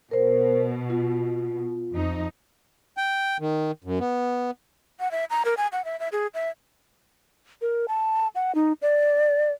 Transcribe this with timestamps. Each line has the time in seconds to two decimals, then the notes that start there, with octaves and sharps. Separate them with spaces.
0.11 B2 A#4 C5
0.90 F4
1.93 F2 D#4
2.97 G5
3.40 D#3
3.84 F#2
3.99 B3
5.00 F#5
5.11 E5
5.30 A#5
5.45 A#4
5.57 G#5
5.72 F#5
5.85 E5
6.00 E5
6.12 G#4
6.34 E5
7.62 A#4
7.88 A5
8.35 F#5
8.55 D#4
8.82 D5